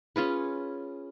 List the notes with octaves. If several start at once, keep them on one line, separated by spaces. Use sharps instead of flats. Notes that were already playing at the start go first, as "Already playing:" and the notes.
C#4 F4 G#4 B4